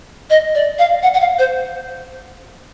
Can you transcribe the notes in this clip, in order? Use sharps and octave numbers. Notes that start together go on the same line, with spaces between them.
D#5
D5
F5
F#5
F#5
F5
C5